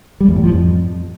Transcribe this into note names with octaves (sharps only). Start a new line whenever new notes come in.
G3
E2
A2
F3
F2